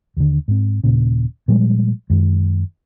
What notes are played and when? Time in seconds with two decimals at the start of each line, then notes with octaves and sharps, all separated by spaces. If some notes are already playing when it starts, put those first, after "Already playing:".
0.17 D#2 D3
0.48 G#2 C4
0.84 D#1 A#2 C#3
1.48 A#2 F3 G3 G#3
2.10 F#2 D#3 G#3